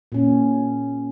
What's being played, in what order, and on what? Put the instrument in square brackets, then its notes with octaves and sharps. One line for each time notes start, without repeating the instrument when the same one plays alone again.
[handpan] A#2 C#4